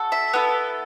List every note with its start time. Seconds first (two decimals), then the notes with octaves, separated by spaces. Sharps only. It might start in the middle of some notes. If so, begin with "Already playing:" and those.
Already playing: F#4 A4
0.12 E5
0.33 B3 E4 A4